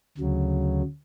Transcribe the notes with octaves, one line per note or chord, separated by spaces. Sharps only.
D2 C#3 F#3